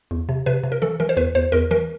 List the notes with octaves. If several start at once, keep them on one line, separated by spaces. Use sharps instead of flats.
E2
C3
C3 B4
C3
A#4
E3 A4
E3 A#4
C5
E2 B4
E2 C5
E2 A#4
E3 A#4